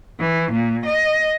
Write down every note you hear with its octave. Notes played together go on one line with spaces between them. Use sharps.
E3
A#2
D#5